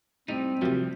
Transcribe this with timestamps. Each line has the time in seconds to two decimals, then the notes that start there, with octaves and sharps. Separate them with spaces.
0.28 A2 G3 C4 D#4 D#5
0.62 F#2 A2 C3 F3 G3